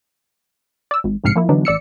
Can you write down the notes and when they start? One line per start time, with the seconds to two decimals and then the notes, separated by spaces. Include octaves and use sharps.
0.91 D5 E6
1.04 G#1
1.24 A#1 G#2 C3 F6 C7 C#7
1.36 F3 A#3 E4
1.49 D3 E3 F#3 B3 D4 D#4
1.65 A1 D5 E6 C#7